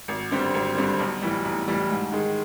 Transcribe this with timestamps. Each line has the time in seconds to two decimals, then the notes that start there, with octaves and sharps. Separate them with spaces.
0.08 G#1
0.31 G2 D3 G3 C4
0.54 G#1
0.76 G2 D3 G3 C4
0.99 B1
1.21 A2 E3 G3
1.45 B1
1.67 A2 E3 G3
1.90 G#2
2.12 D#3 G#3